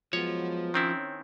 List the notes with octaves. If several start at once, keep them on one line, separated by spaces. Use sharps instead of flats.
F3 F#3 G#3 B3 C#5
D#3 C4 C#4 E4